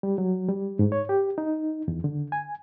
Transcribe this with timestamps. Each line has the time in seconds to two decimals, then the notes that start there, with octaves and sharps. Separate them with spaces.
0.03 G3
0.18 F#3
0.49 G3
0.79 G#2
0.92 C#5
1.09 G4
1.38 D#4
1.88 E2
2.04 D3
2.32 G#5